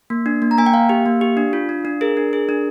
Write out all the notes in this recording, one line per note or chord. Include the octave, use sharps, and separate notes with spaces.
A#3
D4
A#3
A#5
A#3 G#5
G5
A#3 F5
G4
A#3
G4
D4
F4
D4
D4
G#4 A#4
D4
G#4
D4